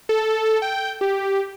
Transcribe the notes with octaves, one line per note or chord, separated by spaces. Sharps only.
A4
G5
G4